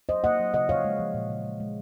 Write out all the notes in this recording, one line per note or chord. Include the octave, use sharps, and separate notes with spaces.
F#3 C5 D#5
A#3 D#5 F#5
F#3
C#3 D#5 F#5
F3 C#5 F5
G#3
F3
A#2
C#3
G#3
G#3